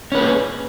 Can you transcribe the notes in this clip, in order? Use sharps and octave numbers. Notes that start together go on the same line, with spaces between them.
A#3 C#4 G#4 B4